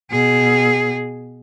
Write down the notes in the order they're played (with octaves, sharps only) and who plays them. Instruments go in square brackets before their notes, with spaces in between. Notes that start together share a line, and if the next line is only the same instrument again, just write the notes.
[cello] B2 G#4